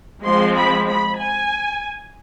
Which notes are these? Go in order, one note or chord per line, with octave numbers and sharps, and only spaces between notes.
F3 G#3 C4 C6
B5
B5
G#5